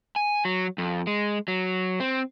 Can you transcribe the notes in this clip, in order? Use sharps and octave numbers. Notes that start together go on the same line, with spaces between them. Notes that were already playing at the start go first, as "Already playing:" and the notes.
G#5
F#3
F2
G#3
F#3
C4